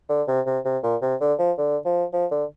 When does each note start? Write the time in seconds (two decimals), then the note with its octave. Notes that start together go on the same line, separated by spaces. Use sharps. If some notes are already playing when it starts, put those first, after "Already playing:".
0.10 D3
0.28 C3
0.46 C3
0.65 C3
0.83 A#2
1.02 C3
1.21 D3
1.39 F3
1.58 D3
1.85 F3
2.13 F3
2.31 D3